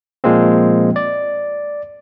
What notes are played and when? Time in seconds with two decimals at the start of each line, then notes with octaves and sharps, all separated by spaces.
0.24 A#2 F3 G#3 A#3 C4
0.96 D5